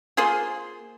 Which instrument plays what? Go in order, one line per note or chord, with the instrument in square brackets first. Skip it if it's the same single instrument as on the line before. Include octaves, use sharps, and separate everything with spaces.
[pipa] A#3 F4 G#4 C5